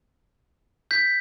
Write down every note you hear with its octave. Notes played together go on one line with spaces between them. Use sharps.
G6 B6